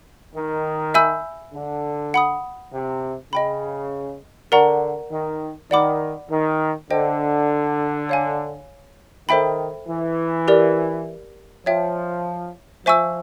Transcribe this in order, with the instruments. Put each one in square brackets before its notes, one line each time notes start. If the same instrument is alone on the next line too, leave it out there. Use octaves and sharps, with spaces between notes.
[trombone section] D#3
[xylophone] E5 G#5 B5 E6 G6
[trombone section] D3
[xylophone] F#5 B5 D#6
[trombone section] C3
[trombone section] C#3 [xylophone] D#5 G5 B5
[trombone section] D3 [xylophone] A#4 D5 F#5 A#5 C#6
[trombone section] D#3
[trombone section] D#3 [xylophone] D5 F#5 B5 D6
[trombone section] D#3
[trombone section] D3 [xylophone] C5 D#5 G5
[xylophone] C#5 F5 G#5
[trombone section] D#3 [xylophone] A4 C5 E5 G5 B5
[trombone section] E3
[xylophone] G4 A#4 D5
[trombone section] F3 [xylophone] C#5 E5 G5
[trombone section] F3 [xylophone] C5 E5 G#5 C#6 E6